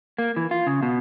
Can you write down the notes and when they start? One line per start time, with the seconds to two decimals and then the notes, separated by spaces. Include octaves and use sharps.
0.18 A#3
0.36 E3
0.51 F4
0.67 C#3
0.83 B2